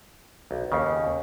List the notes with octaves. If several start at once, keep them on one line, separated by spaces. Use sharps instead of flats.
B1
D#2 C#3